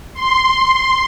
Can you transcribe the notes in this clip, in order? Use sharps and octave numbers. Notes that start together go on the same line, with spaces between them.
C6